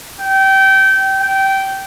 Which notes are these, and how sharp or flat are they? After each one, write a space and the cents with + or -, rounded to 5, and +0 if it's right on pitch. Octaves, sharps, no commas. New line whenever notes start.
G5 -25
G5 -15